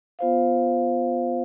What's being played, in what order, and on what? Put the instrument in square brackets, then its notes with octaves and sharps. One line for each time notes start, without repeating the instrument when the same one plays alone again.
[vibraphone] B3 F4 C5 F5